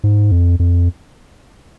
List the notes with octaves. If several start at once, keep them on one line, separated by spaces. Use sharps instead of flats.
G#2
F2
F2